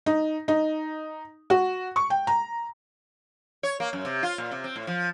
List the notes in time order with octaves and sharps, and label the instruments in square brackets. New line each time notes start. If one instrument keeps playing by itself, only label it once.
[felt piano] D#4
D#4
F#4
C#6
G5
A#5
[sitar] C#5
A#3
F#2
C3
F4
A#2
C3
C4
A2
F3